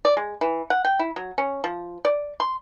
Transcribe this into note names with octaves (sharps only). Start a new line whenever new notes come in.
D5
G#3
E3
F#5
G5
E4
F#3
C#4
F3
D5
C6